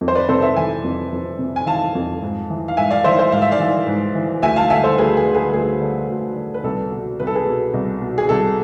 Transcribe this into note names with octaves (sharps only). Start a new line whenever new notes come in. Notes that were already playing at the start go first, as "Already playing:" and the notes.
F2
C5
B4 D5
C3 A4 C5
C5 E5
E3 E5 G#5
F2
F2
C3
G#5
E3 F5 A5
F2
G#2
E3
F5
G#2 E5 G#5
D5 F5
E3 C5 E5
C5 E5
G#2 F5
E5
D5 F5
E3
G#2
E3
D2 E5 G#5
F5 A5
D3 E5 G#5
A4 C5
D2 G#4 B4
G#4
D3
G#4 B4
D2 G#4
D3
D2
D3
B4
C2 A4
B2
C2 B4
A4
G#4 B4
B2
C2
B2
G#4
C2 A4